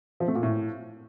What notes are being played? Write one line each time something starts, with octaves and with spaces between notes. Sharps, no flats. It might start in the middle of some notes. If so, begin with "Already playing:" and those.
F3
A3
A#2
A2